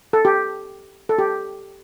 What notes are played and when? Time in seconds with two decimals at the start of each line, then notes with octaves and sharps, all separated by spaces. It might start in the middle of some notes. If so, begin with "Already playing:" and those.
0.13 A4
0.25 G4
1.09 A4
1.18 G4